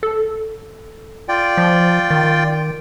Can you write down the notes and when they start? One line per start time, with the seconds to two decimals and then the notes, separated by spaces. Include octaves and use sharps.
0.03 A4
1.29 F4 D5 G5
1.57 F3
2.10 D#3